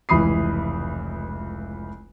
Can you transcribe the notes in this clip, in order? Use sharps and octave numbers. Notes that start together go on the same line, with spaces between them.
F1 C#2 E3 B5 D#6 C7